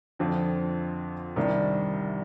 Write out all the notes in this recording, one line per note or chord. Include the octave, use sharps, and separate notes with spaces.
F2 D3 F3 C4 F4
C2 C3 D#3 G3 D4